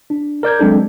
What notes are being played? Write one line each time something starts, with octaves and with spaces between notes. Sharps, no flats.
D4
A#4 D5 G6 G#6
F#3 G#3 C4 D4 A4